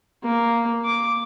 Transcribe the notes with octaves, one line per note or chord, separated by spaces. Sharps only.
A#3
D6